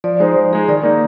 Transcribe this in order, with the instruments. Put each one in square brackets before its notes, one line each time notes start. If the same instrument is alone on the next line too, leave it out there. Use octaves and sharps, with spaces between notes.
[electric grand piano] F3 [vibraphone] D5
[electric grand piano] G#3 D#4 [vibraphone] C5
[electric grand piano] F3
[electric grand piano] G#3 D#4 [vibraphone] G#4
[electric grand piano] D#3 [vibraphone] D5
[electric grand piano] A#3 D#4